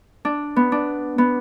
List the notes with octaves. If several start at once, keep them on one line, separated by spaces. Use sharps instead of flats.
D4
B3
D4
B3